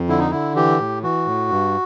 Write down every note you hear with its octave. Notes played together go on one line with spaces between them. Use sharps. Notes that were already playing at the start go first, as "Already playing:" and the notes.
Already playing: F2
D3 E4
D#4
D3 E4
E3 G4
A2
E3 F#4
A2
G2